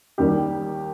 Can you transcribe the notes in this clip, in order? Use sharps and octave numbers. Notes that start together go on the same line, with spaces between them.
D#2 D#3 G3 G4